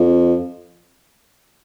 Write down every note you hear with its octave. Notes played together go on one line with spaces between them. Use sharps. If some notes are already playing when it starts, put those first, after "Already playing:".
Already playing: F2